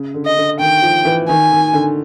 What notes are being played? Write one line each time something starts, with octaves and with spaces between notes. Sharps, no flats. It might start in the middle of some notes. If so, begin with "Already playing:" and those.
Already playing: C#3
D3
D#5
D3
D#3 G5
F3
E3
D#3 G#5
D#3
D3